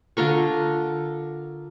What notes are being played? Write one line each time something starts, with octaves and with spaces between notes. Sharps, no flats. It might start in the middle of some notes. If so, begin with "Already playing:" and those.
D3 F4 A#4 C#6